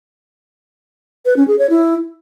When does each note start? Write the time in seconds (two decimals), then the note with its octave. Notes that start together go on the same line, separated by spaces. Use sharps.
1.26 B4
1.37 C#4
1.48 G#4
1.59 C#5
1.70 E4